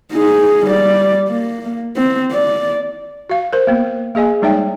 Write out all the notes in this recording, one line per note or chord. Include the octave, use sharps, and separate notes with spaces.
D#4 G#4
G3 D5
A#3
C4
D5
F#4 F5
A#4 C5
A#3 B3
A#3 G#4 D#5 G#5
G3 G#3 D#4 C#5 E5 G5